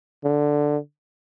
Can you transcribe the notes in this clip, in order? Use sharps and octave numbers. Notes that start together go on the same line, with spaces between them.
D3